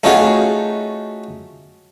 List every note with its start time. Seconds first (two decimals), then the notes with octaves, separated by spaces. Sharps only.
0.04 A3 C#4 D#4 F4 F#4 G#4